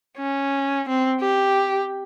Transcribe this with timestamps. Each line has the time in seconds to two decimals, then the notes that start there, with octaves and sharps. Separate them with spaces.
0.17 C#4
0.89 C4
1.20 G4